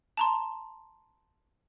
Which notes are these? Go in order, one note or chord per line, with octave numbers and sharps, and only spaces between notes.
A5 A#5 C6